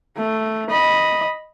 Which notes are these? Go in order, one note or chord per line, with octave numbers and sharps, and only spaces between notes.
A3
D#5 B5